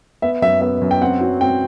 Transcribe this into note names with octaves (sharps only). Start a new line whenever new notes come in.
B3 E5
F#2 E5
B3 E5
F#2
G5
C4 F#5
F#3
C4 G5